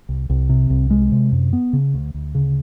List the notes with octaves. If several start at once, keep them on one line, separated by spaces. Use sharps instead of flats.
C2
C2
C3
C2
G#3
C3
F#2
B3
C#3
D2
D2
C#3